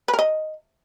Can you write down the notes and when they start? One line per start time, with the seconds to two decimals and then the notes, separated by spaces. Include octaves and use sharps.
0.08 B4
0.13 A#4
0.19 D#5